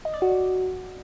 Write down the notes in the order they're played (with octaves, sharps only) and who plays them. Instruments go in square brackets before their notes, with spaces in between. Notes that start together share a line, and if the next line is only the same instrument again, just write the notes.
[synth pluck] D#5
D5
F#4